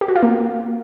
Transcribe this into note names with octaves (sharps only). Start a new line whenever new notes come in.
G4
F#4
F4
A#3